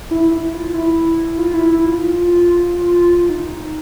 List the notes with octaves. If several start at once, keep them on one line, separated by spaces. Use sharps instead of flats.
E4
E4
F4
E4
F4
E4
E4
F4
D#4